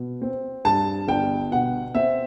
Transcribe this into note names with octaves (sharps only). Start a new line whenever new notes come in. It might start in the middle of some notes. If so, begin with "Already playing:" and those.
Already playing: B2
C4
G2 A5
G1 G5
B2 F#5
C4 E5